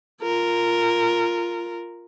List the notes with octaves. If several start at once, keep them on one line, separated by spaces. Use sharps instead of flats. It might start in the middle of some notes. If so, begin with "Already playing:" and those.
F4 A#4